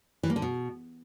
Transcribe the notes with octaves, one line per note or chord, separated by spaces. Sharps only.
E3
A#3
D3
B2